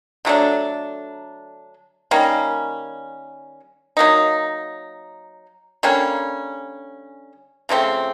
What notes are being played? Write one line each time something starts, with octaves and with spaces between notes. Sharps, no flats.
D3 F#3 A3 D4
D#3 G3 A#3 C#4
F#3 A#3 D#4
D3 G3 A#3 C#4
C#3 F3 A3 C4